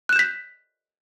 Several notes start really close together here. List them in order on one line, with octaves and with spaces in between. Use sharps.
F#6 E7 G6 B6